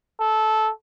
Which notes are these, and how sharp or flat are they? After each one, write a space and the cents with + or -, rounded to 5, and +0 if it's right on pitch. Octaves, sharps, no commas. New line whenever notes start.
A4 -15